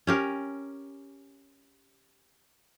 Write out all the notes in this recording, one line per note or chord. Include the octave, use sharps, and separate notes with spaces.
C#4 G4 A#4